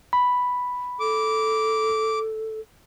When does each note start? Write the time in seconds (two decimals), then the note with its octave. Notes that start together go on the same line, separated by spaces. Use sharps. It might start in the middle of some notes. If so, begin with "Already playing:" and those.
0.13 B5
1.00 A4 D6